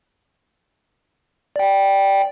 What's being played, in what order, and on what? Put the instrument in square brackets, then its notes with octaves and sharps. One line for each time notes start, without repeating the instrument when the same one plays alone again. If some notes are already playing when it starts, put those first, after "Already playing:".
[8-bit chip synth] D5 G5